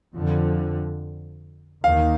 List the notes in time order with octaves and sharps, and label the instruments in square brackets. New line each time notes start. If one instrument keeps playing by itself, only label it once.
[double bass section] F2 D3 F3
[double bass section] D#2 D#3 [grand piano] F5